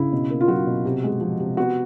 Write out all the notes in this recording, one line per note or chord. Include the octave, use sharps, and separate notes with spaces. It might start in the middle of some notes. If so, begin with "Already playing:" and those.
Already playing: C#3 E4
B2
A#3
F4
F#3 F#4
B2
C3
G#3
F3
C3
B3 F#4